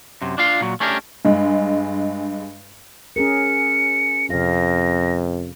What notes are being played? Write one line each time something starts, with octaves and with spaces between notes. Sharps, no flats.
F#2 C3
D4 F4 F5
A#2 F#3
A3 C#4 D4 G4 A#4
G2 G#3
C#4 G#4 A#4 C#7
F2 C3 F5 A#6